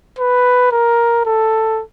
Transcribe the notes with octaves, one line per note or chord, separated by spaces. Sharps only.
B4
A#4
A4